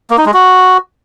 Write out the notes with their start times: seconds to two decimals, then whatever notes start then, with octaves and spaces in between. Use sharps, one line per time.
0.10 A#3
0.18 D#4
0.26 G#3
0.34 F#4